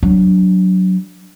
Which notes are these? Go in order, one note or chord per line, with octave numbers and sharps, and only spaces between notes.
F#3 D4